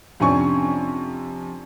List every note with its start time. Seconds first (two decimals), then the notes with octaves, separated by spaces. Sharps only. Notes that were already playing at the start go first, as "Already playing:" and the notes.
0.20 F2 C3 C#4 D4 G#5 C#6